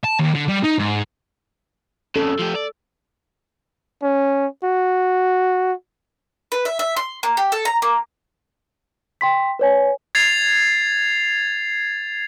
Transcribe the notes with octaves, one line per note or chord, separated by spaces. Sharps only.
A5
D#2
D3
G3
D#4
G#2
F2 C#3 A4
F3 G4
D5
C#4
F#4
B4
E5
E5
C6
A#3
G4
A4
A#5
A#3
G5 C6 B6
B4 C#5 G#5
G#6 A6 C7 F7